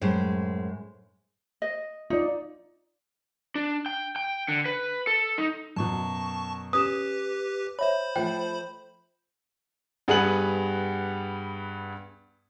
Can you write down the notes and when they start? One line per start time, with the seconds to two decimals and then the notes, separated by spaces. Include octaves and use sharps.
0.01 F#2 A2 G#3 C5
1.62 D#5
2.10 D#4 F4 D5
3.55 D4
3.86 G5
4.16 G5
4.48 D3
4.66 B4
5.07 A4
5.38 D#4
5.76 F#2 B2 A5 C#6
6.73 C#4 G4 B4 D#6 E7
7.79 C5 C#5 E5 B5
8.16 F3 A3 G5
10.08 G2 B3 G#4 B4 F#5 F#7